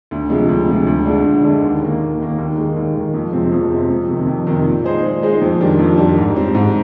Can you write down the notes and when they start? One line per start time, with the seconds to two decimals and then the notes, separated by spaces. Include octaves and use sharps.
0.11 D2
0.30 C3 F3 G#3
0.49 D2
0.68 C3 F3 G#3
0.87 D2
1.05 D3 G#3 D4
1.24 D2
1.43 D3 G#3 D4
1.62 D#2
1.82 D#3 A#3
2.00 D#2
2.19 D#3 A#3
2.38 D#2
2.57 D#3 G#3
2.76 D#2
2.95 D#3 G#3
3.14 F2
3.33 C3 F3 G#3 C4
3.52 F2
3.70 C3 F3 G#3 C4
3.90 F2
4.08 C3 D#3
4.27 F2
4.47 C3 D#3
4.65 A#2
4.84 G#3 D#4 G#4 C5
5.03 A#2
5.22 G#3 D#4 G#4 C5
5.41 F2
5.60 D#3 G3 D4
5.79 F2
5.97 D#3 G3 D4
6.17 G#2
6.35 G3 C4
6.55 G#2